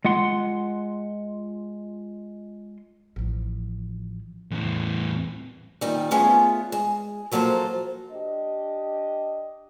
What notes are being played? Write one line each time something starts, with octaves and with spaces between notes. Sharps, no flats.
G#3 F4 F#5 C6
A1 F3
E2 A2
A#2 D#3 G3
A3 B3 C#4 F4 G#4
G#3
F3 F#3 A#3 A4 C5
D4 G4 D#5